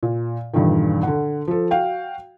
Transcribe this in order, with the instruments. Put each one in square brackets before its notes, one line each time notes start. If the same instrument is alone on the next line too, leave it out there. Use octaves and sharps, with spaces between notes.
[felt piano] A#2
E2 G2 A#2 D3 D#3
D3 F#5
F3 A4
F#4 F5 G5